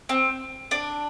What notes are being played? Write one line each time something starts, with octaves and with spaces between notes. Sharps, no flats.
C4
D4